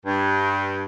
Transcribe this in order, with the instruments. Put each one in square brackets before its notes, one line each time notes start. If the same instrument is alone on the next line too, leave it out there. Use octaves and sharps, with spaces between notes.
[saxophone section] G2